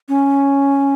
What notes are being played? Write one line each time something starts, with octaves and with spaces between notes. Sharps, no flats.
C#4